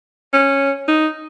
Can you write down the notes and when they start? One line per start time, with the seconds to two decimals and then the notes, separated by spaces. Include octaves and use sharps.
0.33 C#4
0.88 D#4